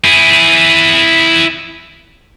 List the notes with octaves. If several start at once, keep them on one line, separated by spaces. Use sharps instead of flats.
E4 G#4